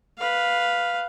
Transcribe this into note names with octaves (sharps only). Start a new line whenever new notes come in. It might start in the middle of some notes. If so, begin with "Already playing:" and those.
B4 F5